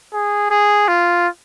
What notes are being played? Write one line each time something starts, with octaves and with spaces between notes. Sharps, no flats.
G#4
G#4
F4